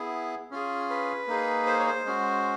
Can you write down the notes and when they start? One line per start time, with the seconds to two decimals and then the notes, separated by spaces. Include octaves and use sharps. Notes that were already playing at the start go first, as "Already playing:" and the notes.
Already playing: B3 E4 G#4
0.51 C#4 F4 G#4
0.90 B4
1.28 A#3 D#4 G#4
1.66 C5
1.80 C#5
1.86 C5
2.05 G#3 C#4 F#4